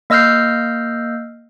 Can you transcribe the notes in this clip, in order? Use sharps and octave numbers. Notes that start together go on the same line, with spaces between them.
A#3 D#5 E6 F6 G6 C7